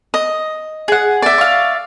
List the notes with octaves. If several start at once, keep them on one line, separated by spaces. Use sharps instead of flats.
D#5
G#4 F#5
D5 E5
F5 C#6